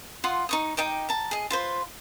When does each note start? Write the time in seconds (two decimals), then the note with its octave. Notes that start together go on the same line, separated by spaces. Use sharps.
0.24 F4 F#5 C6 D#6
0.49 D#4 C#6 D#6
0.77 D#4 D#5 G5 D6
1.09 A5 A#5
1.31 G#4 D#5
1.50 F4 B4 C5